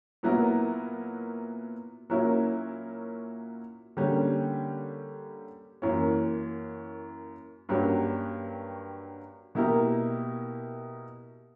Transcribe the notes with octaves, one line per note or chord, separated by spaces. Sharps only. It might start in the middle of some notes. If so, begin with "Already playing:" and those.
A#2 F#3 B3 E4 A#4
A#2 F#3 C#4 E4 A#4
D3 G3 A#3 C#4 G4
F#2 E3 A#3 C#4
G2 F#3 A#3 C#4 G4
B2 A#3 E4 G4 A#4